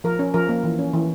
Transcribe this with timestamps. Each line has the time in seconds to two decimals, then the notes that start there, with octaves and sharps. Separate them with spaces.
0.04 F3 A#4
0.19 C#4
0.34 F3 A#4
0.49 A#3
0.64 E3
0.79 C#4
0.93 E3